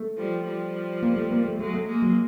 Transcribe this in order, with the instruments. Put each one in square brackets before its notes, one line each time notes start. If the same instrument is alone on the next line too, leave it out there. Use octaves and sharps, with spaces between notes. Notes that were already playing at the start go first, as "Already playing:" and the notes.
Already playing: [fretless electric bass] A3
[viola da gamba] F3 G3
F3 G3
[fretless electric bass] A#3
A3
A#3
A3
[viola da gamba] F#3 G#3 [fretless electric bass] A3
[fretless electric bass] A3
[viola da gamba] G#3 A#3
[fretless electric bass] F#3